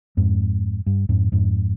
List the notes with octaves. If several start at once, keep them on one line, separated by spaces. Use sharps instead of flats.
F2 G#2
G2
F2 G#2
F2 G#2